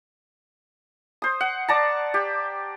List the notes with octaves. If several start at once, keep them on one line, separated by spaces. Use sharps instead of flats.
C5 D#6
F#5
D5 A5 A#5
G4